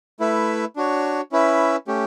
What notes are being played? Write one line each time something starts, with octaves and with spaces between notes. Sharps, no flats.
A3 E4 B4 E5
D4 F#4 C#5
C#4 E4 B4 E5
A3 C#4 G4